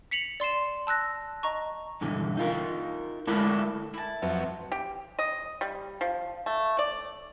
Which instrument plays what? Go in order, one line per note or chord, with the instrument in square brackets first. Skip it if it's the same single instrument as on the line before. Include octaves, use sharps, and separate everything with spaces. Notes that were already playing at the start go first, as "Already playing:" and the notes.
[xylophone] B6 C#7 F7 F#7
D5 C6 C7 E7
A5 E6 F#6 A#6
D#5 A#5 C#6
[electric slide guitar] G2 B2 D3 E3
D#4 F4 A#4
D3 G#3 A3 D4 E4 A#4
[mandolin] E4 A5
[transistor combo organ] F2 F#3 [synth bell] C4 B4 E5
[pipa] G4
D#5
G3
F3
A3
D5